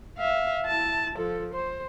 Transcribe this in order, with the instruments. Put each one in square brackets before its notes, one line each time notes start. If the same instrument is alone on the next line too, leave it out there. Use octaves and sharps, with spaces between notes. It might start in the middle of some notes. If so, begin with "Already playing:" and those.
[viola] E5 F5
E4 A5
F3 A4
C5